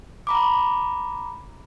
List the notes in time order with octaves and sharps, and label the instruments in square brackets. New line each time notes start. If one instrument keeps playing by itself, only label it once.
[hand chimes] A#5 B5 D6